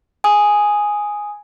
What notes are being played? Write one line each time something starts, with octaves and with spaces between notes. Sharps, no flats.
G#5 D#6